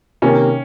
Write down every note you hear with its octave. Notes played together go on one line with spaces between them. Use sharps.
C3 D#3 A#3 C#4